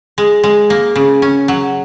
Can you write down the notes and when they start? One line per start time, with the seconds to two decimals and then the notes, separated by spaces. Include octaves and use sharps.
0.18 G#3
0.44 G#3
0.70 A#3
0.96 C#3
1.22 C#4
1.48 F#3